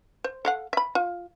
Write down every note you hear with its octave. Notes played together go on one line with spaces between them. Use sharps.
C5
A4 F5 F#5
E5 B5
F4